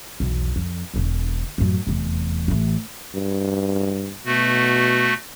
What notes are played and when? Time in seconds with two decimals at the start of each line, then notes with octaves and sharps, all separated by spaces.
0.20 B1 E2
0.56 F2
0.94 E1 D3
1.58 A1 F#2
1.87 F1 E2
2.48 A1 E3
3.14 G2
4.26 B2 A3 F#4